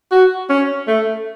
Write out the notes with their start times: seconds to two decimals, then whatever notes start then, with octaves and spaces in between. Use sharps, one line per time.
0.12 F#4
0.50 C#4
0.88 A3